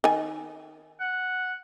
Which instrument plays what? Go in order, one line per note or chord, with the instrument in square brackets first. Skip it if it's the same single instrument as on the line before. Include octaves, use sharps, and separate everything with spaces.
[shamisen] D#3 G#5
[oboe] F#5